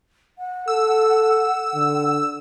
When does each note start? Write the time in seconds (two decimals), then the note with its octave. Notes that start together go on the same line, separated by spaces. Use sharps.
0.38 F#5
0.68 A4 E6
1.74 D3